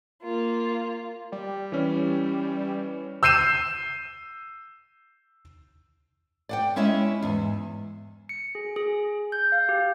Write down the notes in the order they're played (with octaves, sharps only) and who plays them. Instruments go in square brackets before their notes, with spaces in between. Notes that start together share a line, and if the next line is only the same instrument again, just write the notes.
[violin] A#3 F4
[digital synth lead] G3
[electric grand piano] E3 C#4
[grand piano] E6 G6 C7 D#7 E7
[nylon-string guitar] D5 F#5 G5
G#3 C#4 E4 C#5 D#5 E5
E2 G#2
[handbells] C#7
G#4
G#4
G6
F5
G4